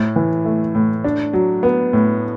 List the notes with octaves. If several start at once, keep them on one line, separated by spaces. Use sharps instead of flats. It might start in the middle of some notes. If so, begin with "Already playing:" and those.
Already playing: A2
E3
A3
A2
D4
F#3
B3
A2